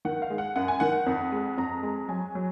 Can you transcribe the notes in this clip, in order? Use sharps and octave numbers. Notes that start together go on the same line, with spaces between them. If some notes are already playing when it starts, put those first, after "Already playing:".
D#3 F#5
F5
G#3
F#5
F#2 F#5
G#5
D#3 F#5
F2
G#3
F2 A#5
G#3
F#3 G#5
F#3